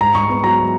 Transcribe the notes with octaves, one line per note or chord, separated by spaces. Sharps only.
G#2 A#5
G#2 C#6
B3
F#3 A#5